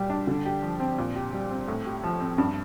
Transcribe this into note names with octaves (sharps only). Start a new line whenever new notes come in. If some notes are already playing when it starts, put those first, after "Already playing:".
Already playing: A#2 G3 G4
D4
D3
G4
F3
C4
A#2
G4
G3
C4
A2
G4
F3
C4
G2